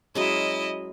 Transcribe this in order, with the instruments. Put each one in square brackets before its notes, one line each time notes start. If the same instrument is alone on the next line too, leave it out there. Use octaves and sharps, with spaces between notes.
[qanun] F#3 G#3 C#4 [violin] E4 D#5